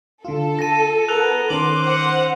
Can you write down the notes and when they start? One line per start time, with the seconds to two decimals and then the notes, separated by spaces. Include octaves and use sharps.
0.25 D3 F4 A4
0.59 F4 A5 A#6 D#7
1.09 B3 A#4 E6 F#6 F7
1.50 D#3 C#4 C6 D6 F#7
1.81 C5 F#5